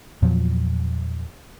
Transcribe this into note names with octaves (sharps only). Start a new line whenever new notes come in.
E2 A#2 F3 F#3